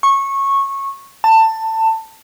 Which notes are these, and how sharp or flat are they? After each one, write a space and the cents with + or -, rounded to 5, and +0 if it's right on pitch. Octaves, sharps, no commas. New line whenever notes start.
C#6 -15
A5 +20